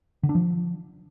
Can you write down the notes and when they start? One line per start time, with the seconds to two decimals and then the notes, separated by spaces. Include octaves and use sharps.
0.23 D3
0.29 D4
0.35 F3